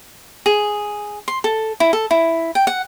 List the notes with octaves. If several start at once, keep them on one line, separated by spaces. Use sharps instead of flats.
G#4
C6
A4
E4
A4
E4
G5
F#5